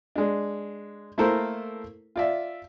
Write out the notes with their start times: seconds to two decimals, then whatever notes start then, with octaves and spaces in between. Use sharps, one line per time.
0.16 G#3 D4
1.18 A3 A#3 E4 A4 A#4 C5
2.16 F4 D5 E5